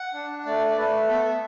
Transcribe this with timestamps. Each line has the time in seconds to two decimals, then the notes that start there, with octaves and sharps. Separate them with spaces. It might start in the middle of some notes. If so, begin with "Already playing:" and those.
Already playing: F#5
0.14 D4
0.45 A3 D5
0.67 D5
0.77 A3 B4
1.08 B3 A4
1.24 E5